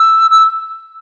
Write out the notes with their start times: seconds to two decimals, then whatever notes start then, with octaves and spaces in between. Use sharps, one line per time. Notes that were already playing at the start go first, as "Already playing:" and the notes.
Already playing: E6
0.31 E6